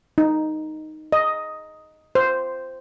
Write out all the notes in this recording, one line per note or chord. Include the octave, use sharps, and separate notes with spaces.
D#4
D#5
C5